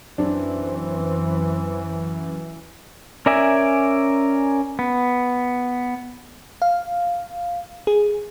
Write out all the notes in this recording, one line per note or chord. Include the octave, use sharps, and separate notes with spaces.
F#2 E3 C4 D4
C#4 A#4 D5 E5 G#5
B3
F5
G#4